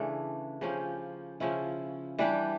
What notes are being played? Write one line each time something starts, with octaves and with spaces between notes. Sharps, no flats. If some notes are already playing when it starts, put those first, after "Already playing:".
Already playing: C#3 E3 A3 D4
C#3 F3 C#4 G4
C#3 F3 C#4 E4
E3 G3 D4 G4